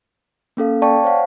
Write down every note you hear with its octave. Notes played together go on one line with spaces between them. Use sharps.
A#3 C#4 A4 F5
D5 F5 G5 A5 C#6
C5 C#5 F5 F#5